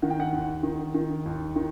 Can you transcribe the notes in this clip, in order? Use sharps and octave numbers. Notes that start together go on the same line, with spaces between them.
D#3 F#5
G5
F#5
D#2
D#3
D#3
D#2
D#3